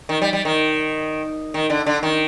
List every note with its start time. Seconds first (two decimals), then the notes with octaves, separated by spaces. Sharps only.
0.09 D#3
0.22 G3
0.33 G3
0.45 D#3
1.54 D#3
1.70 D3
1.86 D3
2.03 D#3